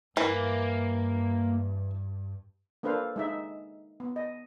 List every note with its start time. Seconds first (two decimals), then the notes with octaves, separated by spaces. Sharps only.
0.17 G2 E3 A#3
2.83 A#3 D4 A4 B4 C5 F5
3.16 G#3 D#4 E5
4.00 B3
4.16 D#5